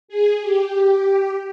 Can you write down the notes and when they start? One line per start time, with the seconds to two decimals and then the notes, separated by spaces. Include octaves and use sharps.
0.08 G#4
0.41 G4